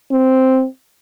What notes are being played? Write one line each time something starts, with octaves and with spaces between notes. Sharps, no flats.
C4